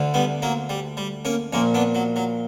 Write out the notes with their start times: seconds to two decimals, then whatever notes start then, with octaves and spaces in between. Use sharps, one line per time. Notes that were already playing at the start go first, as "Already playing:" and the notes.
Already playing: D2 D3
0.14 G3 B3
0.42 F#3 A#3
0.69 G3
0.97 G3
1.25 A#3 C#4
1.53 A#1 A#2 A#3 C#4
1.74 B3 D4
1.95 F#3
2.16 F#3